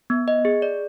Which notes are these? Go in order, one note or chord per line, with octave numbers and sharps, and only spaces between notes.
B3
D#5
G#4
D5